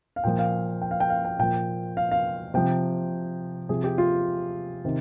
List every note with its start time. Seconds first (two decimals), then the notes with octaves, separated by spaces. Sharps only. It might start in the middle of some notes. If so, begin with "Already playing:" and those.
0.16 F5
0.24 A#2 F3 G5
0.39 F5
0.82 G5
0.91 F5
1.00 G5
1.10 F5
1.25 G5
1.39 A#2 F3 G5
1.97 F5
2.11 F5
2.54 C3 F3 G5
3.69 C3 F3 G#4
3.84 G4
3.98 F4
4.85 C3 D#3